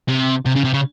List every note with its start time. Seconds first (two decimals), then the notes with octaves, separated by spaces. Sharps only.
0.08 C3
0.46 C3
0.55 C#3
0.64 C3
0.73 C#3